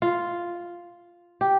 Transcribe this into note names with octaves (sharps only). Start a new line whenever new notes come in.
F4
G4